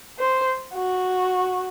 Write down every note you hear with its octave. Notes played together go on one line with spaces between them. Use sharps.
C5
F#4